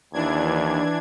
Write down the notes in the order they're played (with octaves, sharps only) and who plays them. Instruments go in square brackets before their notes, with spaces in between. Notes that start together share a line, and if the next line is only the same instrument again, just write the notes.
[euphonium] D#2 [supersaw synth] E3 D4 G#6